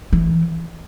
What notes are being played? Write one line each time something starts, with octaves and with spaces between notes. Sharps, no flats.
E3